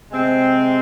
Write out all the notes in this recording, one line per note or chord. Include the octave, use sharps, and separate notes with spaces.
C3 G#3 C4